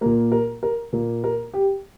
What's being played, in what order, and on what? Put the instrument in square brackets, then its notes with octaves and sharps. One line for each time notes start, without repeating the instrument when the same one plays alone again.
[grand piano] A#2 A#3 A#4
A#4
A#4
A#2 A#3
A#4
G4